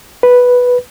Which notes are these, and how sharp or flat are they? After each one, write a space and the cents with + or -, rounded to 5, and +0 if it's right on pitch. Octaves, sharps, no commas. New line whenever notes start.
B4 -5